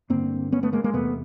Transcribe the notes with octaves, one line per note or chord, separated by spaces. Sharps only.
G2 D3 A#3 C4
B3 C#4
A3 B3
G#3 A#3
G#3 A#3
E2 C3 A3 B3